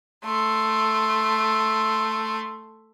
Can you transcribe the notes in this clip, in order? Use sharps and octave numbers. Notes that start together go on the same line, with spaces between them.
A3 C6